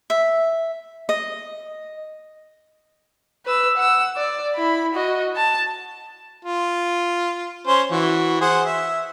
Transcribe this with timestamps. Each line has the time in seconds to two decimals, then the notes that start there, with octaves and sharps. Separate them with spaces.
0.10 E5
1.09 D#5
3.45 B4 E6
3.77 F#5 E6
4.16 D5
4.55 E4 B5
4.94 F#4 D#5
5.36 A5
6.45 F4
7.67 C#4 C5
7.91 E3 F#4
8.41 G#4 C5 F#5
8.65 E5